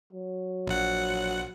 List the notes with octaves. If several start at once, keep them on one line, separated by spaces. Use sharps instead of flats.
F#3
A#1 F#5